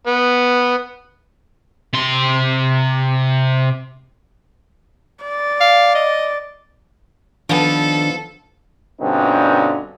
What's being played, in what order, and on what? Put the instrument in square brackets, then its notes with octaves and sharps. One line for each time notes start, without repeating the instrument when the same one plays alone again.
[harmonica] B3
[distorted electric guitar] C3 C6
[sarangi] D5
[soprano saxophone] F5
D#5
[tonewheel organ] D#3 D4 [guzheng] F3 B3 [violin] A4
[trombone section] G2 B2 D3 C4 C#4 D#4